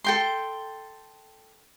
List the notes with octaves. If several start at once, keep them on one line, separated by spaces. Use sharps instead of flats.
A4 G5 C6